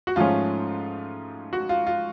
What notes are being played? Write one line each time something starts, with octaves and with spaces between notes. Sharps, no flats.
F#4
G#2 F3 A3 C#4 F4
F#4
F4
F4